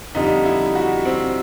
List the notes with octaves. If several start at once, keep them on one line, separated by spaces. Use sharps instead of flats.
F2 D3 G3 D#4
E4
F#4
C4